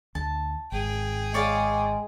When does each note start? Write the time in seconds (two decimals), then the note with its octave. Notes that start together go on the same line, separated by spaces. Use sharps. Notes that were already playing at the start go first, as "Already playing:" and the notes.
0.15 D2 A5
0.72 G#1 G#4 G5
1.34 G#3 C#5 D5 F5